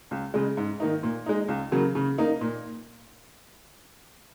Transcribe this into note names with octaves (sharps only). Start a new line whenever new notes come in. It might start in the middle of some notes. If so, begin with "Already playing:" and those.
C#2
C#3 G#3
G#2
D#3 A#3 D#4
A#2
G#3 D#4
C#2
C#3 F#3 A#3
C#3
A#3 D#4
A#2